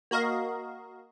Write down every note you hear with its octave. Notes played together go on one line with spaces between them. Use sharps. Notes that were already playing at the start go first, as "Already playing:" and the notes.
A#3 F#4 A#4 D#5 F5